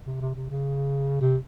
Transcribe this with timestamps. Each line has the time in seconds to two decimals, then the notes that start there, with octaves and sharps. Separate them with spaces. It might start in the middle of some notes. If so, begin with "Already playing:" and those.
0.06 C3
0.21 C3
0.35 C3
0.50 C#3
1.21 C3